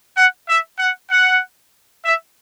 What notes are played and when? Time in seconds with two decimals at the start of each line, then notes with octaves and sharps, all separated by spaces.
0.17 F#5
0.48 E5
0.79 F#5
1.11 F#5
2.05 E5